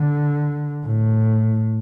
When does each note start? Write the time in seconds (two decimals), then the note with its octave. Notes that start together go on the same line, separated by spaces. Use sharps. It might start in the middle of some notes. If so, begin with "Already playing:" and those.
Already playing: D3
0.84 A2